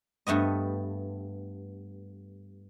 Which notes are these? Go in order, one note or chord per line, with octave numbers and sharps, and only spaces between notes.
G2 A3 B3 D#5